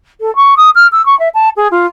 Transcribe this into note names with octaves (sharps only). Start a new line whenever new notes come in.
A4
C#6
D#6
F6
E6
C#6
E5
A5
G#4
F4